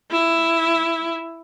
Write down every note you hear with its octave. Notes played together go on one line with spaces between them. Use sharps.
E4